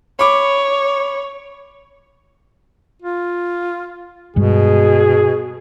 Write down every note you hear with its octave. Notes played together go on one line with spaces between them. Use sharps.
C#5 B5 D6
F4
G2 B2 G3 G#3 G#4